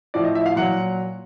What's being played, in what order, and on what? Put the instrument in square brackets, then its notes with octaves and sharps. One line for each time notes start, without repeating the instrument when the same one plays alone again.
[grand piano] A2 F3 D5
D#5
E5
F5
A#2 F#3 F#5